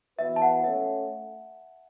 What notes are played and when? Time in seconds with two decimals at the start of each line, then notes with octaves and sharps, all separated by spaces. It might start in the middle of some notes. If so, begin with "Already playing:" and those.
0.19 E3 B3 F#4 B4 E5
0.36 A5
0.42 F#5
0.64 A3 C#4 A4 C#5 E5